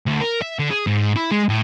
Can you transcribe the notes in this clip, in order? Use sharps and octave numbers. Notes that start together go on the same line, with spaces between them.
D2
A#4
E5
D3
G#4
G#2
E4
G#3
A2